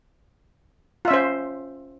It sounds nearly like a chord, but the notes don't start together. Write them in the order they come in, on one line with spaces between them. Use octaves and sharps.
F4 E5 C#4 C5